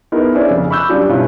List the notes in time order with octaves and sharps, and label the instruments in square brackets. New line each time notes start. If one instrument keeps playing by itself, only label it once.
[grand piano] B3 D#4 E4 G#4 A#4
C#4 D4 E4 G#4 C5 D5
F1 F2 C#3
B5 C#6 D6 E6 F#6 G6
F#3 G3 C#4 D4 F4
B1 G2 C#4 E4 F4